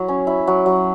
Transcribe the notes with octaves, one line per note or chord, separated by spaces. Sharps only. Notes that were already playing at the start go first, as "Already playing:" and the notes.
Already playing: F#3 E4
C#4
E4
F#3
F#3